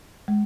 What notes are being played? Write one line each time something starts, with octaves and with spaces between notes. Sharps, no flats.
G#3